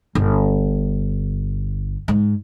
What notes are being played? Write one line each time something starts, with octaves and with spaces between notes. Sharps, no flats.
G1
G#2